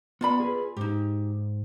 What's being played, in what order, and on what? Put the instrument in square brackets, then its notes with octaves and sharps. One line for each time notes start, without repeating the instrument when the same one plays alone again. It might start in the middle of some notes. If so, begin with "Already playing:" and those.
[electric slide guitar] B3 [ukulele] F4 D5 B5
[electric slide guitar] G#4 B4
[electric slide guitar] G#2 [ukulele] D#4 G4